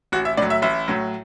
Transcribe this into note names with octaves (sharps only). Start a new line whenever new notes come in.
A1 F#4
E5
A2 F#3 D5
E5
A1 E5
A2 F#3